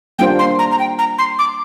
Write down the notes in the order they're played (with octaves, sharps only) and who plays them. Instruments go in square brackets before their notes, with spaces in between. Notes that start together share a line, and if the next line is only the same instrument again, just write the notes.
[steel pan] G3 A#3 D4 F4 C5 [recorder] G5
[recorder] C6
A#5
A#5
G5
A#5
C6
D6